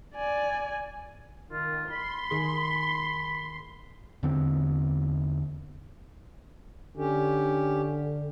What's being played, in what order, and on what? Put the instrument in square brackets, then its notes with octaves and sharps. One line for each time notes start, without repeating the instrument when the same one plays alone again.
[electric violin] D5 G#5
[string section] D#3 [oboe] F4
[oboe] B5 [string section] C6
[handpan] D#3 G#4
[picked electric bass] E2 D3 C4
[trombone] D3 [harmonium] C#4 G4